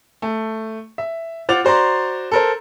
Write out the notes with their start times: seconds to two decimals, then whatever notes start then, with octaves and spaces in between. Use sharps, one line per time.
0.22 A3
0.98 E5
1.49 F4 C5 F#5 D6 A6 F7
1.65 F#4 C5 D5 A#5 C6
2.32 A4 A#4 C5